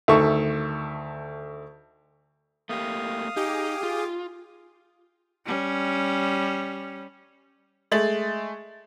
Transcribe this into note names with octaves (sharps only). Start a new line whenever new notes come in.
D2 D#3 A4 E5 C#6
A3 A#3 G4 F5 D#6
D#4 G4 G#4 D6
F4
G3 C#4
G#3 A3 A6 F#7